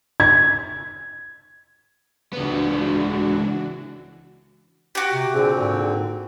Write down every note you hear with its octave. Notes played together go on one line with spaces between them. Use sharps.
G#6
C#2 E3 B3 D4 F#4
F#4 G4
C3
A#2 D3 C4 G#4
G#2